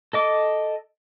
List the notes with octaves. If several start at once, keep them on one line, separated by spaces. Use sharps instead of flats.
A4 D#5 D6